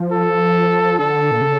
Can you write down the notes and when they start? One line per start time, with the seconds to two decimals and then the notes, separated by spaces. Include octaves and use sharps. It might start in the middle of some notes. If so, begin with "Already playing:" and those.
Already playing: F3
0.12 A4
0.99 D3 A4
1.31 A#2
1.41 C#3